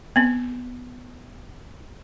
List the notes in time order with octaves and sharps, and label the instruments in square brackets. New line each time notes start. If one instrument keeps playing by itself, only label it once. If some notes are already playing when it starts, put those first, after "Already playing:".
[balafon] B3 C4